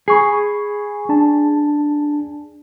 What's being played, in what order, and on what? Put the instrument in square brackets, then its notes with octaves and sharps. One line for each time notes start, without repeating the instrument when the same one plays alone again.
[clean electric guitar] G#4 [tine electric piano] B5 C#6 C7
[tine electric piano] D4 A5